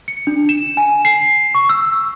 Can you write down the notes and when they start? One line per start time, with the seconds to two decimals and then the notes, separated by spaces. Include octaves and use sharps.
0.08 C#7
0.27 D4
0.49 E7
0.77 G#5
1.05 C7
1.55 C#6
1.69 E6